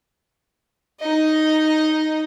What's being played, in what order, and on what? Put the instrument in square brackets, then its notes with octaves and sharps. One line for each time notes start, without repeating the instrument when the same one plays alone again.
[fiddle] D#4 D#5